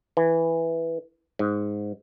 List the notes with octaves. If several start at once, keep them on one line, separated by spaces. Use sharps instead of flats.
E3
G#2